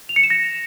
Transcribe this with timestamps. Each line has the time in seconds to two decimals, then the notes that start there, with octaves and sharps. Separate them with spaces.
0.09 F7
0.16 C#7
0.23 E7
0.30 A#6